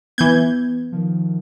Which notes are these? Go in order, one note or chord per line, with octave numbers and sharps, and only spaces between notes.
E3 B3 G6 G#6
D#3 F3